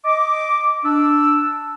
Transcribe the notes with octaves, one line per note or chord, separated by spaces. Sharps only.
D#5 D6
D4 E6